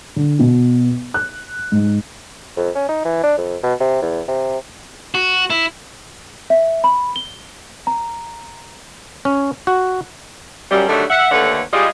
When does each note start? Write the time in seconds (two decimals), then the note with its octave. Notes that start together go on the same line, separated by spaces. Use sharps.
0.16 D3
0.39 B2
1.14 F#6
1.72 G#2
2.57 F2
2.75 C#4
2.89 D#4
3.05 E3
3.24 D4
3.38 F2
3.63 B2
3.80 C3
4.02 E2
4.28 C3
5.15 F#4
5.50 E4
6.50 E5
6.84 B5
7.16 G7
7.87 A#5
9.25 C#4
9.67 F#4
10.71 F#2 G3
10.89 D3 D#3 F#3 G3 A3 D4
11.10 E5 F#5
11.31 D#2 D3 A3 B4 C#5 F#5
11.73 G3 G#3 F4